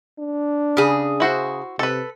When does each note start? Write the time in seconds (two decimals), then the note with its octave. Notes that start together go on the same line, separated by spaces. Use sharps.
0.19 D4
0.77 C#3 G#4
1.20 E4 F#4 C5
1.79 C3 A4 B4